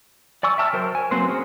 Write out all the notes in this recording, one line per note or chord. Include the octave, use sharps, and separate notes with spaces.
D5 G#5 C#6 E6
E5 G5 A5 E6 F6
F#3 A#4 C5
G#5
F#3 A#3 C4 B4 C5
C#4 G#4 A#4 C#5